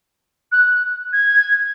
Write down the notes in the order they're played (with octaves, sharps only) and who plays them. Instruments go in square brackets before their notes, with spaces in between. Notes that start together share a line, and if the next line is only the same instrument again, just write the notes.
[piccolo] F#6
G#6